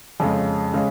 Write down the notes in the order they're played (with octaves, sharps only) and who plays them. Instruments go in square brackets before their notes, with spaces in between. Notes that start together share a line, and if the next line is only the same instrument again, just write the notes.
[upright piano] F2 C#3 G#3
C#3 G#3